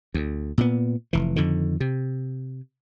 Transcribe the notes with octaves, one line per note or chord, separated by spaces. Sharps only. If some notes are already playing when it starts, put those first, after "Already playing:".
D2
A#2 B3
F1 E3
F2 D3 D#3
C3